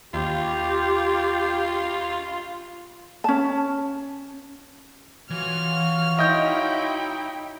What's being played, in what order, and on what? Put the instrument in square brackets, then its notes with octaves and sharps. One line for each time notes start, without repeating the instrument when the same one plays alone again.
[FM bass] D#2 [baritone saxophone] F4 [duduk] G4
[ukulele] C#4 A5
[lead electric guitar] E3 [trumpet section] F4 F#4 C#5 [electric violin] F6
[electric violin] D#4 E4 [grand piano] D#5 G6 [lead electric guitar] G5